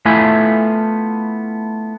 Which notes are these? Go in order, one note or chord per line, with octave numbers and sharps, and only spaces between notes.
A3 B3 E4 F4 E5 G#5